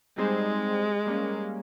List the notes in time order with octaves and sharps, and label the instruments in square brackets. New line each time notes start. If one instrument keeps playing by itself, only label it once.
[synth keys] G3 C4 D#4 G#4 C5 [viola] G#3
[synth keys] G3 A#3 C#4